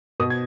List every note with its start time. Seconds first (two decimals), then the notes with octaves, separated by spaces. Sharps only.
0.20 B2 D#6
0.30 G#6